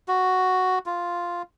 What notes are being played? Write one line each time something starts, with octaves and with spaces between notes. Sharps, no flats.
F#4
F4